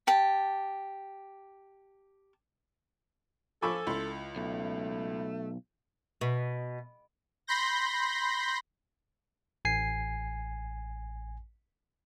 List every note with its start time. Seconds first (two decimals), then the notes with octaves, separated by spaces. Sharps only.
0.07 G4 A5
3.62 F3 A4 G#5 B5 C#6 D6 E6
3.87 C#2 E4 B5 C6
4.36 B1 A3
6.21 B2
7.47 B5 C6 G6 A#6
9.65 A1 G#5 C7